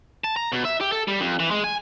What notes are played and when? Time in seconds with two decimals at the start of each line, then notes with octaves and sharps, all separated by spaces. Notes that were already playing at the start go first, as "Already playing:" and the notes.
0.24 A5
0.36 A#5
0.52 B2
0.65 E5
0.81 G4
0.92 A4
1.08 G3
1.20 F2
1.39 E3
1.51 G#3
1.64 G#5